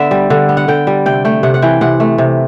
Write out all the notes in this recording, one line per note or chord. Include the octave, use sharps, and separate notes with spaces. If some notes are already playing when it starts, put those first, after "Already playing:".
Already playing: D3 B3 D5 E5
G3
D3
B3
F#5
D3 G5
G3
C3 G5
A3 G5
C3 F#5
F#5
E3 G5
C3 F#5
A3
C3